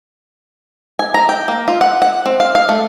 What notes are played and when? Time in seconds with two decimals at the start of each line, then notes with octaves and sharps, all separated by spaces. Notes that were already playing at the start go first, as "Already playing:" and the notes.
0.99 G#5
1.14 A#5
1.29 G5
1.48 A#3
1.68 F4
1.81 F#5
2.02 F#5
2.26 C4
2.40 F5
2.55 F5
2.69 A3